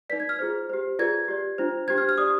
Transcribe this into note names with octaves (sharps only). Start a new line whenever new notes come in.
D#4 B4 D5 B6
G#6
F6
F4 G#4 C5
G4 C5
F4 G#4 B4 D5 G#6
G4 D5
D4 F4 C5
D4 G4 C5 G#6
F6
F6
G4 D5 D#6